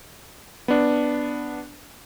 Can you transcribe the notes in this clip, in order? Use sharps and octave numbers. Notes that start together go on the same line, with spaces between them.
B3 D4